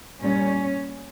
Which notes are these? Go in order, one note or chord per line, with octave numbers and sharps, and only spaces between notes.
A#2 G3 C#4